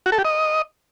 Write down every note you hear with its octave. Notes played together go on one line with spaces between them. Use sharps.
F#4
A4
G4
D#5